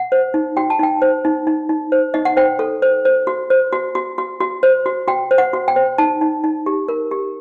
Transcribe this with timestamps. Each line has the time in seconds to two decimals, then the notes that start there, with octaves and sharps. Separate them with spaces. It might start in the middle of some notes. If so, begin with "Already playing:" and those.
Already playing: F#5
0.12 C5
0.34 D#4
0.57 F#4 G5
0.70 A5
0.79 D#4 G5
1.02 C5
1.25 D#4
1.47 D#4
1.69 D#4
1.92 C5
2.14 D#4 D#5
2.25 F#5
2.37 C5 G5
2.59 A4
2.82 C5
3.05 C5
3.27 F#4
3.50 C5
3.73 F#4
3.95 F#4
4.18 F#4
4.40 F#4
4.63 C5
4.86 F#4
5.08 F#4 G5
5.31 C5
5.38 F#5
5.53 F#4
5.68 G5
5.76 C5
5.98 D#4 A5
6.21 D#4
6.44 D#4
6.66 G4
6.88 A#4
7.11 G4